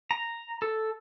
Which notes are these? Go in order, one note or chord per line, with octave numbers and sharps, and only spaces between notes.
A#5
A4